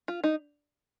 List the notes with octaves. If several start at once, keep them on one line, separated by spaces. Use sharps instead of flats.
F4
D#4